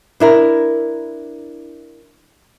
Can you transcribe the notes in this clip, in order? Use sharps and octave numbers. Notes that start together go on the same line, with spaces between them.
D4 E4 A#4